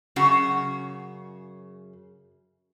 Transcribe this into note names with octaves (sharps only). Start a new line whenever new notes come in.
F#2 C#3 F#4